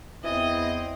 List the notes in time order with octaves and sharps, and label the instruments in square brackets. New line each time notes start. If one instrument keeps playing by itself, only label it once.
[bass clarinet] E2 [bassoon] E3 [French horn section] C4 E4 [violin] D#5